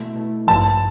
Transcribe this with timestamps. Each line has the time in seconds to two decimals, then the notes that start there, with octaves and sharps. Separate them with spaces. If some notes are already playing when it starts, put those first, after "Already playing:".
Already playing: B2 A3 E4
0.15 B2 A3 E4
0.47 A1 G2 F3 A5